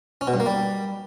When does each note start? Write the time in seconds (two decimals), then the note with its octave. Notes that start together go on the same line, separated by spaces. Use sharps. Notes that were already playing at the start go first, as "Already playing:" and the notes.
0.21 C#4
0.27 B2
0.34 G2
0.40 A#3
0.46 G3